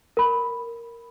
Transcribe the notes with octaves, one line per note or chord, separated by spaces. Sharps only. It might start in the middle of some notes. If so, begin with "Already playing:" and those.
A#4 B5